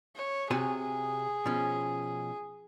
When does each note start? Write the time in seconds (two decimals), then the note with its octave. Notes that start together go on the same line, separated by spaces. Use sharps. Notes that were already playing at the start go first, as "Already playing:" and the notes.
0.16 C#5
0.51 C3 F#4 G#4 G#5
1.46 B2 F3 C#4